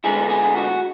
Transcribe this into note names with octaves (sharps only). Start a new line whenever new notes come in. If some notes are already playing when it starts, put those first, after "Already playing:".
D3 G#3 B3 E4 G#4
G#4
F#4